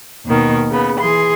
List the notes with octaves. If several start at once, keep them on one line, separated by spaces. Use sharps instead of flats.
D#2 B2 D#3
C#3 B3
E3 G#4 C6